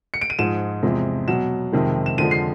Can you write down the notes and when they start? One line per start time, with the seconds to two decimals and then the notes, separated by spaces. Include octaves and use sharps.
0.14 C#7
0.21 D7
0.30 D#7
0.39 G#2 F3 G#3 E7
0.83 E2 C3 F3 G#3
1.28 B2 F#3 E7
1.73 F2 C3 D#3 G#3
2.06 E7
2.17 F2 D3 F3 G#3 D#7
2.31 C7